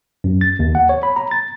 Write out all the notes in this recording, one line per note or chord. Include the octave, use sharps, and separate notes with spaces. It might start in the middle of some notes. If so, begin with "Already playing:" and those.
F#2
A6
D#2
F#5
C#5
B5
A#5
A6